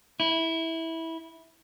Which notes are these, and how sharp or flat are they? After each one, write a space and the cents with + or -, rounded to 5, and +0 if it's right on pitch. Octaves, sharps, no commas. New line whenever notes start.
E4 -15